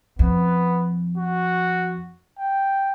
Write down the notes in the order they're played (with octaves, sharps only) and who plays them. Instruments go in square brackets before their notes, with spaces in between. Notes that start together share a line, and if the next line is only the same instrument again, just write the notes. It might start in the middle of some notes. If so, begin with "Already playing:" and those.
[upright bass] F2 [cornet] B3
[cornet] F#4
G5